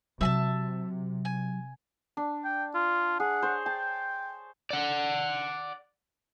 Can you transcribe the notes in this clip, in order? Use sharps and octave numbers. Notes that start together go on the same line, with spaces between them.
C3 F#3 E5 G#5 A5
G#5
D4
G5
F4
G#4 F#5
C5 C#5
G5 A5
D5 F#5